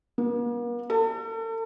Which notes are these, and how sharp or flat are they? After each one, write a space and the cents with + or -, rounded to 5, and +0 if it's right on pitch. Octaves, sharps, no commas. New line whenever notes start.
A#3 +45
A4 +40